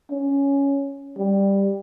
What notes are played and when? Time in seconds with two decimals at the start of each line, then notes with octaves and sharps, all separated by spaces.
0.11 C#4
1.18 G3